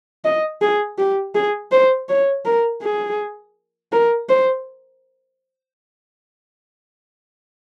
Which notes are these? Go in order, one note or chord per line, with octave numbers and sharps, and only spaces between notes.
D#5
G#4
G4
G#4
C5
C#5
A#4
G#4
A#4
C5